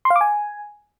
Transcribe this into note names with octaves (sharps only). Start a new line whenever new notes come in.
C6
F5
D6
G#5